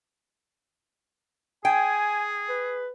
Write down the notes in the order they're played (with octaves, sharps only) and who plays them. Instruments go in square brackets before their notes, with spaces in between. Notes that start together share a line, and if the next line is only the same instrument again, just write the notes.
[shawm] G#4 [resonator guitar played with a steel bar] G5 [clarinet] G#5
[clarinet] B4